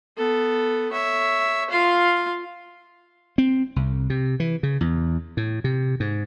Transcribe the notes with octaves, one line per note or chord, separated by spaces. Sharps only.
B3 A4
C#5 E5
F4 F5
C4
C2
C3
E3
C#3
E2
A2
C3
G#2